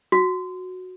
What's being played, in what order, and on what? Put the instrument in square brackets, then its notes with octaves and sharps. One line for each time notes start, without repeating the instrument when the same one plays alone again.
[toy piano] F#4